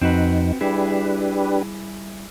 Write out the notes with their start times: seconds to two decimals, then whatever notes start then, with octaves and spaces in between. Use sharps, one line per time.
0.02 F2 C4 D#4 F#4 B4
0.61 G3 D4 E4 G4 G#4 B4